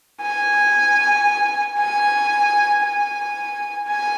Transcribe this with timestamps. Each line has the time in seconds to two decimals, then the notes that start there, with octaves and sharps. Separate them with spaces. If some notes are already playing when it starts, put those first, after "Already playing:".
0.22 G#5
1.78 G#5
2.82 G#5
3.87 G#5